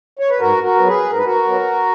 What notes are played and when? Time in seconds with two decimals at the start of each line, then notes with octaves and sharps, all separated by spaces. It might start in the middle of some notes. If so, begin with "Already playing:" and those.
0.19 C#5
0.30 B4
0.40 G#2 F#4 A#4
0.63 F#4 A#4
0.75 F#3 B3
0.86 G#4 B4
1.10 G#2 A#4
1.18 B4
1.25 F#4 A#4
1.45 F#3 B3